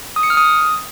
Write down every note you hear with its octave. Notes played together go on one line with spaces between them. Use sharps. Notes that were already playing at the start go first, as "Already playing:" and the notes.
D#6
C#7
F6
D#6